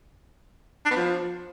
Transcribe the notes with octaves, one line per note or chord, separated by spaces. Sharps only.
D4
B3
F3